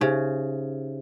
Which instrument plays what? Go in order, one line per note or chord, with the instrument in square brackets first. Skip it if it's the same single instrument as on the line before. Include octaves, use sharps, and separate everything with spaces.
[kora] C#3 [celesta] D#4 G4 C5 E5